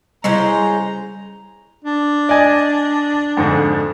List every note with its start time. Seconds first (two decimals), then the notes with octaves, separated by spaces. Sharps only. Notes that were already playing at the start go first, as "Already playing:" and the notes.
0.24 C#3 G3 G#3 E4 C5 A#5
1.85 D4
2.29 D5 D#5 G#5
3.37 F2 G#2 D3